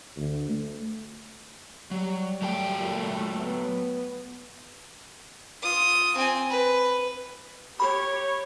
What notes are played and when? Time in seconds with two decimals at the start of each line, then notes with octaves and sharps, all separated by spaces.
0.17 D2
0.50 A3
1.91 F#3 G3
2.42 F#3 A3 A4 G5
2.78 A#2
3.36 B3
5.62 F4 D#6
6.16 C4 G#5
6.50 B4
7.80 G4 C#5 B5